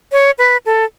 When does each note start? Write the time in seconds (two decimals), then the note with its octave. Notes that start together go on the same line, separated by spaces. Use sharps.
0.12 C#5
0.38 B4
0.66 A4